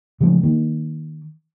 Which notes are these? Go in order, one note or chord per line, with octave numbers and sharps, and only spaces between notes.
C#3 F3 G#3 A3
D#3 A#3